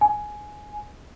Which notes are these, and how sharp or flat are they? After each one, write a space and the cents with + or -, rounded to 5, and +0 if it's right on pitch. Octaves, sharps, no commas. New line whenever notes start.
G#5 +10